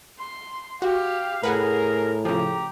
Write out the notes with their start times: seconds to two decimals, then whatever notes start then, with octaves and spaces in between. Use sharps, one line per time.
0.20 C6
0.82 F#4 G4 F5
1.43 A2 G#4 A#4 B4 F#5 G#5
2.25 C#3 F3 G4 A#5